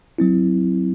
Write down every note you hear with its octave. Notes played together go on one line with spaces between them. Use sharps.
F#3 C4 E4